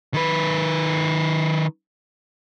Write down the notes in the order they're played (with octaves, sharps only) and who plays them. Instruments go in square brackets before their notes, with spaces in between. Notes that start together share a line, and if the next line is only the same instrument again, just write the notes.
[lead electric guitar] D#3 B4